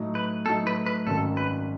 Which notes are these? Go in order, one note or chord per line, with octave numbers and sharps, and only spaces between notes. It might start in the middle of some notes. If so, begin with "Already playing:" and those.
Already playing: A2 F#3 A3 D#4
B4
A2 F#3 A3 D#4 A4
B4
B4
G#1 F#2 D#3 A4
B4